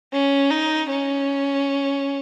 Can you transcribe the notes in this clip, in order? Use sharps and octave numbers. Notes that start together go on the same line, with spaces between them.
C#4
D#4
C#4